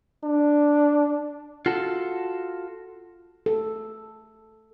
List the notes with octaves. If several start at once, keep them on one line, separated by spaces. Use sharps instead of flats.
D4
F4 F#4 A4
A4